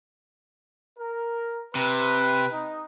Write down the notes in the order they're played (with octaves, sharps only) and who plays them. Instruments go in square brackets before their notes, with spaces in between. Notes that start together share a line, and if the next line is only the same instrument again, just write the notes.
[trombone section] A#4
[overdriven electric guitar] C3 [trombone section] B4
[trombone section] D#4